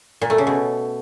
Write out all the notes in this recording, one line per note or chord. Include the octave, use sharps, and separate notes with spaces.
A#2
A3
C#3
B2